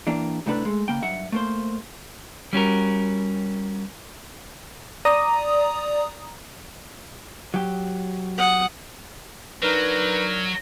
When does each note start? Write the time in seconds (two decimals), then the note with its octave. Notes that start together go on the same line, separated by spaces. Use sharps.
0.07 E3 A#3 D4 G4
0.46 C2 A2 C3 A3 D4 B4
0.65 G#3 A3
0.88 C#3 A#3 G5
1.02 G2 F#3 E5 F#5
1.32 A3 A#3 C5
2.53 G3 C#4 F#4 A#4
5.05 D5 A#5 D#6
7.54 F#3 G4
8.38 F#5 D#6
9.63 F#3 D4 D#4 A#4 B4